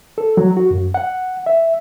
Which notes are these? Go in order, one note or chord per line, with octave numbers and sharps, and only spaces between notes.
A4
F#3
F#4
F#2
F#5
E5